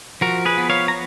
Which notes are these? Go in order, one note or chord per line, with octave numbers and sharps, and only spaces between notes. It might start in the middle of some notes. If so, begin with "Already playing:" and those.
F3 F#4 A#4
G#4 B4
B3
C#5 F5
A#5